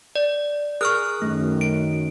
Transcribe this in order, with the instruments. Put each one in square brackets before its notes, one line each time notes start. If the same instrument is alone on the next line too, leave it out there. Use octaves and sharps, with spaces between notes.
[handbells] D5
[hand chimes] G#4 A#4 D#6 [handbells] C#6 F6 F#6
[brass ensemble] F#2 D#3 [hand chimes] A3
[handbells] D7